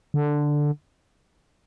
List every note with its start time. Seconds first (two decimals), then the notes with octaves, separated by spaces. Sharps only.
0.14 D3